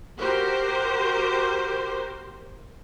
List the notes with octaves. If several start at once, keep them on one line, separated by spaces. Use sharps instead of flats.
F#4 G4 A#4 C5